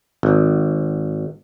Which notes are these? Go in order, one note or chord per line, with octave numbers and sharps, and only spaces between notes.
G#1